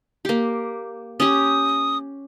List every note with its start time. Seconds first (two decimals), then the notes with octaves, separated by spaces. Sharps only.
0.25 A#3 G4
1.20 C#4 G4 D#6